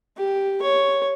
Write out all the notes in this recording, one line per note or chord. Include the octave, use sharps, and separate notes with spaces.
G4
C#5